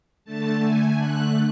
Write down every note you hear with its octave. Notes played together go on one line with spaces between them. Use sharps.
D3 A3 A5
G#5
F#6